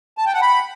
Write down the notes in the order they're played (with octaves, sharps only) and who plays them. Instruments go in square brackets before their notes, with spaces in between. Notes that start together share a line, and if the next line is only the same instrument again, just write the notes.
[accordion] A5
G5
F#5
B5